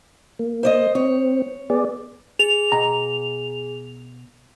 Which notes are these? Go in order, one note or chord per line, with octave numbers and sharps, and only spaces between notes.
A#3
C5 D5 D#5
C4 C#5
B3 G#4 D5
G#4 F7
B2 A#5